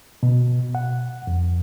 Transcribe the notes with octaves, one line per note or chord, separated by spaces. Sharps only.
B2
F#5
F2